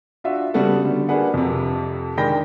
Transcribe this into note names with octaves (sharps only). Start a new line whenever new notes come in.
D4 F4 F#4 E5
C#3 G3 B3 F#4 A4
D3 G3
A#3 D4 F#4 G#4 B4 F#5
F2 C3
D#3 G#3 D4 G5 B5 A#6